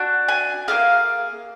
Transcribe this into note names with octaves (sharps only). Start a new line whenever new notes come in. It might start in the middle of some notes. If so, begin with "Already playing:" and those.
Already playing: D4 F#4
G#5
A#3 F4 G#4 F5